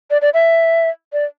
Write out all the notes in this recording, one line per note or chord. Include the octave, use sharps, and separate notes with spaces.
D5
D5
E5
D5